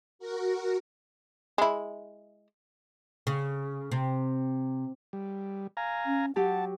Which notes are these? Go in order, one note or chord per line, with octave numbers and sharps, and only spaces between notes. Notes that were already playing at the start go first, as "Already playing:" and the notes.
F#4 A#4
G#3 E4
C#3
C3
G3
F5 G#5 A#5
C#4
F#3 G4 F#5 A5